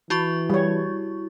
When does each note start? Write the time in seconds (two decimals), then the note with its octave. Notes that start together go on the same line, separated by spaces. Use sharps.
0.10 E3 E4 F#4 C#6
0.50 G3 C#5